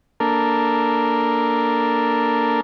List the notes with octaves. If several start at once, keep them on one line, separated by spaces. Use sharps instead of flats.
A#3 D4 A4 A#4